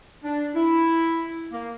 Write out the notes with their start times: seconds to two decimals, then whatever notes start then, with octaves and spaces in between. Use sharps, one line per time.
0.24 D4
0.55 E4
1.52 A#3